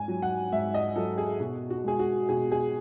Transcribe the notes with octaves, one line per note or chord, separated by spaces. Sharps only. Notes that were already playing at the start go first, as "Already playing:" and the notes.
Already playing: G#2 G#5
F#3
F#5
G#2 E5
D#5
F#3 A4
G#4
B2 F#4
F#4
G#3 G#4
F#4
B2 G#4
G#4